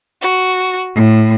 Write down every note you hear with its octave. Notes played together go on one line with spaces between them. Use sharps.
F#4
A2